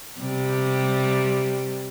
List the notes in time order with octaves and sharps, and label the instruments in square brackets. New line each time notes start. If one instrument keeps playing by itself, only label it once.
[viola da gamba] C3 G3